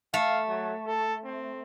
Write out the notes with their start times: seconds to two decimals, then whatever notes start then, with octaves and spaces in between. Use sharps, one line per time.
0.14 A3 F5
0.48 F#3
0.87 A4
1.24 C4